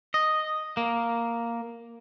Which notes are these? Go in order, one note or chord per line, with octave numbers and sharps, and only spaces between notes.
D#5
A#3